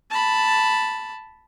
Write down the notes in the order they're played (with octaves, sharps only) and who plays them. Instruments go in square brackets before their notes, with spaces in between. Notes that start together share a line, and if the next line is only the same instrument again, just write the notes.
[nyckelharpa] A5 B5